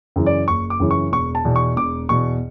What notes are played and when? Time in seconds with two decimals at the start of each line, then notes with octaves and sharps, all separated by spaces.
0.16 F#2 C#3 E3
0.26 D5
0.48 F#1 C#6
0.70 D6
0.80 F#2 C#3 E3
0.91 C#6
1.12 E1 C#6
1.35 A5
1.45 E2 B2
1.56 C#6
1.77 E1 D6
2.09 E2 B2 C#6